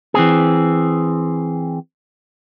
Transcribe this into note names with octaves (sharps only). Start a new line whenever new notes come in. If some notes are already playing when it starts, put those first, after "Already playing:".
E3 C4 G#4